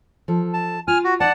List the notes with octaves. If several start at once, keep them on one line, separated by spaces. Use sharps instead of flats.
F3 A4
A5
F4 G#5 F6
F#4
C4 D#4 D5 F#5 A5